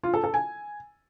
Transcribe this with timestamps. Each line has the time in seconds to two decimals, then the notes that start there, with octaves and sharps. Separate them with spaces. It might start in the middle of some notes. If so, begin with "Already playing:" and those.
0.03 F4
0.14 A4
0.24 A4
0.34 G#5